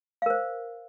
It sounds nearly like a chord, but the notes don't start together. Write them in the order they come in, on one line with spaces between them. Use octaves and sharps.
F5 A#4 C5